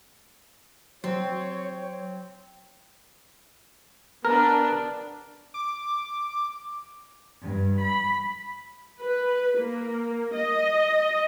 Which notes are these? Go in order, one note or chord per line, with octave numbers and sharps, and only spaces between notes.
F#3 C4 C#5
B3 D4 A#4
D6
G2
B5
B4
A#3
D#5